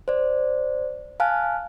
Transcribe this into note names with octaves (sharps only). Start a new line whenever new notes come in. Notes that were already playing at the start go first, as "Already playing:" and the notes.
C5 D5
F5 G#5 A5 F6 F#6